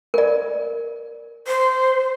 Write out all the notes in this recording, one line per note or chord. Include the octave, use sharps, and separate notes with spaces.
A#4 D5
C5